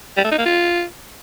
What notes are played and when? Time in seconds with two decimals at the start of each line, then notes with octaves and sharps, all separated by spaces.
0.17 G3
0.24 A3
0.31 D#4
0.38 A#3
0.46 F4